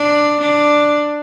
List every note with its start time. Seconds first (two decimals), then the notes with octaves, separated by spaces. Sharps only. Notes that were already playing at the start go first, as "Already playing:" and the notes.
Already playing: D4
0.41 D4